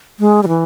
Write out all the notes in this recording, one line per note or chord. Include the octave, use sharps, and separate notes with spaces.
G#3
G3
E3